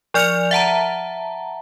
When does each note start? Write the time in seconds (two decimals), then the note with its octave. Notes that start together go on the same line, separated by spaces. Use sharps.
0.14 F3 D5 F6 C#7 F7
0.51 E5 F#5 A5 A#5